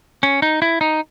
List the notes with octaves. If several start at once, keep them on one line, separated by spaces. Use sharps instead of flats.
C#4
D#4
E4
D#4